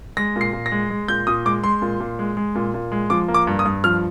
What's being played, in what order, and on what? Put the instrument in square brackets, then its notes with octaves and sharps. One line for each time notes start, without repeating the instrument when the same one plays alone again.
[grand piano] G#3 A#6
A#2
C7
A#2
A#6
G#3
G#3
A#2 G6
A#2 D#6
G#3 D6
G#3 C6
A#2
A#2
G#3
G#3
A#2
A#2
G#3
F3 D6
A#3
D6
G2
D#6
G2
F3 F6